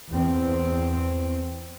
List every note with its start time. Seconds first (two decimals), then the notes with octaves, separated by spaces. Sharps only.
0.13 E2 C4